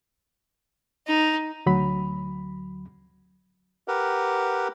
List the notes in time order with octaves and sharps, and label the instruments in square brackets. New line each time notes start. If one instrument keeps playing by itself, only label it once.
[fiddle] D#4
[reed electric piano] D2 F#3 B5
[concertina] G4 A#4 B4 F#5